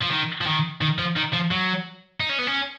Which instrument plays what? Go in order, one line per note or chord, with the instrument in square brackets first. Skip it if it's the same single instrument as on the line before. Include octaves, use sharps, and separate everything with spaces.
[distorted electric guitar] F3
D#3
F3
D#3
D#3
F3
D#3
F3
F#3
D#4
C#4
B3
C#4